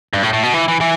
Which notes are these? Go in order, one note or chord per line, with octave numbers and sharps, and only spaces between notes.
G2
A2
A2
B2
E3
E3
E3